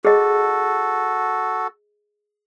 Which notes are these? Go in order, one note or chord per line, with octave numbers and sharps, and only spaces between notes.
F#4 G#4 A4 D#5